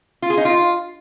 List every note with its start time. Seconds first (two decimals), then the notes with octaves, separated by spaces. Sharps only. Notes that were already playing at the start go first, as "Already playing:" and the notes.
0.22 F4
0.30 G#4
0.37 D#4
0.45 F4